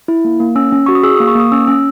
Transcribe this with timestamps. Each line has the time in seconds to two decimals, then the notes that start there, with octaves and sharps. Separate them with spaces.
0.08 E4
0.25 A#3
0.40 A#3
0.55 C#4 E6
0.72 C#4
0.86 F#4 C#6
0.95 D#6
1.03 G#4 E6
1.16 D#6
1.20 A#3
1.27 C#6
1.35 A#3 D#6
1.52 C#4 E6
1.67 C#4 E6